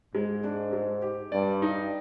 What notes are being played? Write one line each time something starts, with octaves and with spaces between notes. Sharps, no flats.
G#2 G#3
D4
G#3
G4
G2 D5
D#4